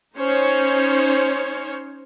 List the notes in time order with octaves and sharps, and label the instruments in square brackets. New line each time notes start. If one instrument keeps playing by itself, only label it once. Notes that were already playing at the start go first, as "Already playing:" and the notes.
[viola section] C#4 D#4 C5 C#5